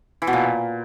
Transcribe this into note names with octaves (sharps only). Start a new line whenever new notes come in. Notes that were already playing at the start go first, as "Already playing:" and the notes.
E3
B2
A#2